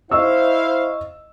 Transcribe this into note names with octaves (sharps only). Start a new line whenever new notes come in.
E4 C5 D#5 F5 C#6 E6